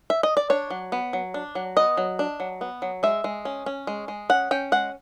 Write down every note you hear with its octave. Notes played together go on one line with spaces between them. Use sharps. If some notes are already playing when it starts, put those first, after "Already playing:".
E5
D#5
D5
D4 C#5
F#3
B3
F#3
D4
F#3
B3 D#5
F#3
D4
F#3
B3
F#3
G#3 E5
G#3
C#4
C#4
G#3
G#3
C#4 F#5
C#4 G5
G#3 F#5